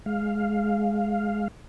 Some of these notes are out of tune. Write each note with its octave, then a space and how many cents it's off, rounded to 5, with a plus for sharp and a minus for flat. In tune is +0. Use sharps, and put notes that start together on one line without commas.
G#3 +5 F5 +0